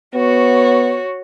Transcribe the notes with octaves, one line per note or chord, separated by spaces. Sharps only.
B3 F#4 C#5